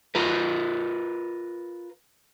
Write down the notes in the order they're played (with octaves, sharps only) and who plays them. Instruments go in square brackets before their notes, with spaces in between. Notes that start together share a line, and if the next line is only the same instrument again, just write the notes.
[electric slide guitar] F4 A#4 B4